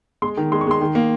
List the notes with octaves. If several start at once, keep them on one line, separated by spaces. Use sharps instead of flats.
G#3 C6
D#3
G#3 C6
C#6
G#3 C6
D#3
A#3